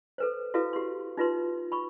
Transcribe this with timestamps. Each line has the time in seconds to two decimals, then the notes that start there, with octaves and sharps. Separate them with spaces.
0.18 A4 B4 C5
0.54 E4 F#4 A4 B4 F5
0.73 G4 C6
1.17 D#4 F4 B4 C6
1.72 B5 C#6